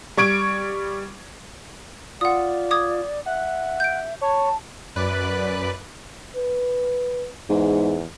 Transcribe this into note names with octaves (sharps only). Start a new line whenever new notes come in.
G3 C#6 G#6 D7
F4 D5 F#5 D#6
D6 D#6 G#6
E5 F#5
G6 D7
C#5 A5
F#2 B4 D5 F#6
B4
E2 G#2